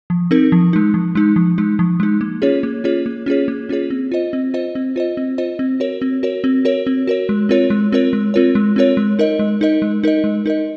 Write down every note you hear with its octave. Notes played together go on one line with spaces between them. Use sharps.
F3
C4 D#4 A#4
F3
G#3 D#4
F3
G#3 D#4
F3
G#3 D#4
F3
G#3 D#4
A#3
C#4 F4 G#4 C#5
A#3
C#4 F4 G#4 C#5
A#3
C#4 F4 G#4 C#5
A#3
C#4 F4 G#4 C#5
C4
F4 C5 D#5
C4
F4 C5 D#5
C4
F4 C5 D#5
C4
F4 C5 D#5
C4
F#4 A#4 C#5
C4
F#4 A#4 C#5
C4
F#4 A#4 C#5
C4
F#4 A#4 C#5
G#3
C4 F4 A#4 C#5
G#3
C4 F4 A#4 C#5
G#3
C4 F4 A#4 C#5
G#3
C4 F4 A#4 C#5
G#3
D#4 A#4 D#5
G#3
D#4 A#4 D#5
G#3
D#4 A#4 D#5
G#3
D#4 A#4 D#5